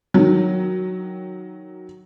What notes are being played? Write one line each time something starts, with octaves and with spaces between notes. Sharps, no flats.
D#3 F#3